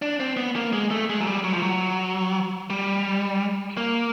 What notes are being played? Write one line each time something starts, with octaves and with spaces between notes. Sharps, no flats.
D4
C4
B3
A#3
G#3
A3
G#3
F#3
G3
F#3
F3
F#3
G3
A#3